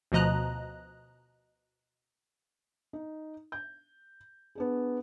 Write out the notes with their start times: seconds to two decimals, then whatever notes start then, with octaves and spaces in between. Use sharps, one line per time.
0.12 D2 B2 F3 D#5 A#5 F#6
2.93 D#4
3.52 G6
4.55 B3 D4 G#4